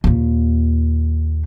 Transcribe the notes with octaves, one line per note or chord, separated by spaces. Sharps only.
D#2 A#2